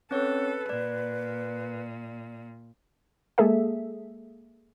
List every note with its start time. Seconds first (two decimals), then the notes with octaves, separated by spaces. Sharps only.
0.11 C4 C#4 A4 B4 C#5
0.69 A#2 D5
3.38 G#3 A#3 G#4 A4 E5